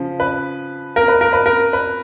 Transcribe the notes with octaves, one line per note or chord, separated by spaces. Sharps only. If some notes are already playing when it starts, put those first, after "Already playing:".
Already playing: C#3 F3
B4
A#4
B4
A#4
B4
A#4
B4